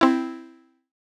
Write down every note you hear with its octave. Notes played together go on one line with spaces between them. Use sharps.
C4 E4